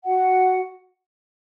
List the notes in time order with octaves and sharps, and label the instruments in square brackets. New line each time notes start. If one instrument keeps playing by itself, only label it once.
[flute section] F#4 F#5